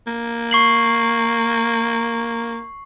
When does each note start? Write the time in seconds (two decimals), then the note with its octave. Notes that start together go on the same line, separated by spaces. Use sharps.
0.07 A#3
0.51 C#6 C7 F#7